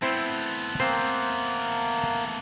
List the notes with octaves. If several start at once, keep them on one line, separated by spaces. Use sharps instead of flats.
A3 B3 C4 E4 C5
A#3 C4 C5